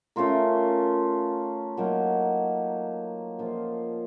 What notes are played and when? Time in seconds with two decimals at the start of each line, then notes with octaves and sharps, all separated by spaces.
0.16 A3 C#4 F4 A#4
1.77 F#3 A#3 D#4 A#4
3.39 F3 A#3 F4